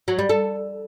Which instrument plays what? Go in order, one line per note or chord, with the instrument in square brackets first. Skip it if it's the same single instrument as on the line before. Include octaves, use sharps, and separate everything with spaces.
[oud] F#3
G3
A4